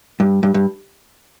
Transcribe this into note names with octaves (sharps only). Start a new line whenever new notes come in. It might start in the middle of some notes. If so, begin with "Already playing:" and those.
G2
G2
G2